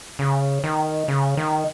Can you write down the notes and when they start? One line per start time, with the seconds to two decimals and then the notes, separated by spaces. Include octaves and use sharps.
0.19 C#3
0.64 D#3
1.08 C#3
1.37 D#3